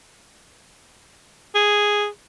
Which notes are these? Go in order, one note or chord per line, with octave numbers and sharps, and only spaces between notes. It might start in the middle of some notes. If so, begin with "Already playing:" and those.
G#4